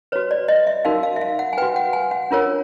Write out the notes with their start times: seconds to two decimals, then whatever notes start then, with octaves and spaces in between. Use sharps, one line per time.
0.12 F#4 B4 C#5
0.31 D5
0.48 D#5
0.67 E5
0.85 D#4 F#4 A#4 F5
1.03 F5
1.16 E5
1.21 F5
1.39 F#5
1.53 G#5
1.58 F#4 B4 G5
1.76 F#5
1.93 G#5
2.11 F#5
2.31 D4 F4 A#4 C#5